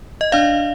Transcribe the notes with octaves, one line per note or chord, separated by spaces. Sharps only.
D#5
D4 D5 F5